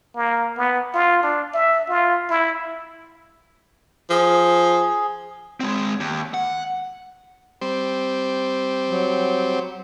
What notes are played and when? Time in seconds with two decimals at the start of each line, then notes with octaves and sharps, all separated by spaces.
0.15 A#3
0.57 B3
0.94 F4
1.23 D4
1.54 E5
1.89 F4
2.30 E4
4.10 F3 G#4
5.60 G#3 C4
6.00 D#2
6.34 F#5
7.61 G3 C4 C5
8.91 F#3